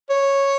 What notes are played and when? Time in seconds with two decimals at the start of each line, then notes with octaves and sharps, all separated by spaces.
0.10 C#5